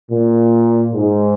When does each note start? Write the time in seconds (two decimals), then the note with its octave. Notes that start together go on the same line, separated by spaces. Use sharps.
0.10 A#2
0.93 G#2